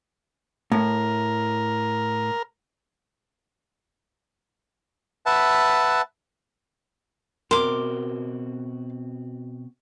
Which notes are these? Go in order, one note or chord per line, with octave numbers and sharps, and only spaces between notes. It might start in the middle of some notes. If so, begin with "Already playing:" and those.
A2 A#4
B4 E5 F#5 A5
B2 C4 F#4 A#4 C6 D6